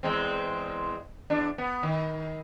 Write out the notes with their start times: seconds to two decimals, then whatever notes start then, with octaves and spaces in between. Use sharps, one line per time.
0.03 E2 G#3 C4
1.30 E2 D4
1.58 B3
1.83 D#3